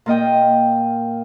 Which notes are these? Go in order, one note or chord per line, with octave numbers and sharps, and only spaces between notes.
A#2 A#3 D#5 G5